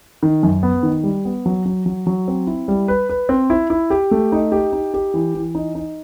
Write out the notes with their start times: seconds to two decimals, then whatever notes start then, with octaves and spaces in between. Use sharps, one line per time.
0.23 D#3
0.43 F#2
0.63 B3
0.83 D#3
1.04 G3
1.25 B3
1.46 F#3
1.66 F#3
1.86 F#3
2.07 F#3
2.28 C4
2.47 E4
2.68 G3
2.88 B4
3.09 B4
3.29 C4
3.50 E4
3.70 E4
3.90 G4
4.11 A3
4.32 D#4
4.52 G4
4.73 D#4
4.94 G4
5.14 E3
5.34 E3
5.55 D#4
5.75 D#4